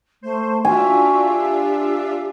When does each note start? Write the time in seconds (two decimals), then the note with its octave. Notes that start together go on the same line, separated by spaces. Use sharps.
0.22 A3 C5
0.65 D4 F4 F#4 E5 G#5
1.27 G4